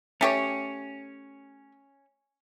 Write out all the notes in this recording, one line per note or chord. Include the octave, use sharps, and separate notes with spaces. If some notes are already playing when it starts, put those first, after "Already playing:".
A3 C#4 G4 C#5